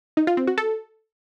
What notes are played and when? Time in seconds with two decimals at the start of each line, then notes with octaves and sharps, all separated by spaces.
0.17 D#4
0.27 F4
0.37 C4
0.47 F#4
0.58 A4